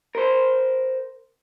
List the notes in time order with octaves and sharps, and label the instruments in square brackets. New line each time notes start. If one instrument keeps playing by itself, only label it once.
[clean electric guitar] A#4 C5